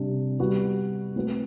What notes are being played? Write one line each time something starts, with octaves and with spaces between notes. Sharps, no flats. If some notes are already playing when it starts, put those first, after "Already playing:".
Already playing: C3 G3 D4 G4
G3 B3 F#4
A3 C4 F#4 B4